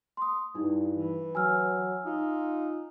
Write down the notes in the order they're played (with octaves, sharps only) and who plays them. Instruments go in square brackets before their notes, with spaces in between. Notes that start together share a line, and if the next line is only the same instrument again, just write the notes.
[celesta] C6 D#6
[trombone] G2 [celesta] D#4 E4
[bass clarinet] E3
[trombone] F#3 [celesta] G#5 E6 F6
[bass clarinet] D#4 [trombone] F4